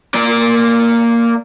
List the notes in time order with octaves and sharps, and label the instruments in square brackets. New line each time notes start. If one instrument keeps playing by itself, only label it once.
[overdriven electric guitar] A#3 D5